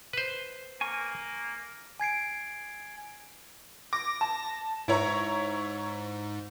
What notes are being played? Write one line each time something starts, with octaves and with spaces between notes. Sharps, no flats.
B4 C5
A#3 G#5 C#6
G#5 G#6 C7 D7
D6 A#6
A5
G#2 E4 C#5 A#5